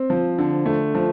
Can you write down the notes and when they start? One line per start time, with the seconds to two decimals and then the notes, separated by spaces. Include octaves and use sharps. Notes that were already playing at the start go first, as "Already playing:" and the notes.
Already playing: C4
0.10 F3
0.38 D3
0.66 A3
0.95 F3